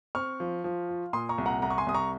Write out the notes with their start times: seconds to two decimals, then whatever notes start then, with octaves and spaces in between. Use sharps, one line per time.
0.15 C4 C#6 F6
0.40 F3
0.64 F3
0.89 F4
1.13 A#2 C6 D#6
1.29 A#5 C#6
1.38 C2
1.46 F#5 A#5
1.62 C2 F#5 A#5
1.70 C#6
1.78 G#5 C6
1.86 C2 D#6
1.94 A#5 C#6